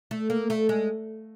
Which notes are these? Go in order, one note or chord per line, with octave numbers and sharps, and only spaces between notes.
A3
A#3
A3
G#3